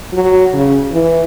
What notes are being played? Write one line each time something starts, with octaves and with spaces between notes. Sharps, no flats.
F#3
C#3
E3